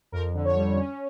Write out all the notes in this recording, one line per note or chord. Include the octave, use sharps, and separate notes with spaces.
F2 A#4
D3
C#5
G3
C#4